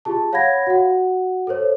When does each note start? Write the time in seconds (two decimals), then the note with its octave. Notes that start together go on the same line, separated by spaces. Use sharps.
0.05 F4 G4 G#4 A5
0.32 C#5 F5 F#5 B5 G#6 A#6
0.67 F#4 F#5
1.47 A4 A#4 C5 C#5